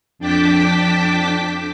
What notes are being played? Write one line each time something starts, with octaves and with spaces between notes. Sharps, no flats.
F2 D4 G5 A5 D6 B6